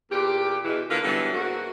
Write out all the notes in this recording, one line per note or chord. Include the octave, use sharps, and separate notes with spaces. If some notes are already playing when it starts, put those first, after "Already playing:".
E2 A#2 G4
E2 B2 E3
D3 A#3 F4 B4
D3 E3 F#3 G3 B3
G#2 A#3 F#4